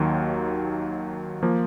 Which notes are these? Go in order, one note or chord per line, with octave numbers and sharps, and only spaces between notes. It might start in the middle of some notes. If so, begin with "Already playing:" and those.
Already playing: D#2 D#3 F#3 A#3
F3 A#3